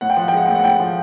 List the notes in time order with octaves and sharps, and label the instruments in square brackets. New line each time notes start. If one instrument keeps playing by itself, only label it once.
[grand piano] A2 F#5
G5
F3 F#5
G5
G#3 F#5
A2 G5
F#5
A2 G5
F3